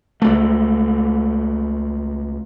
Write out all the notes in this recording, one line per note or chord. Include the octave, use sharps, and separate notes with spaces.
C#2 A3